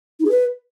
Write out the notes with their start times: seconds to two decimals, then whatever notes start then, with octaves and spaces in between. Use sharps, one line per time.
0.20 D#4
0.25 G#4
0.30 B4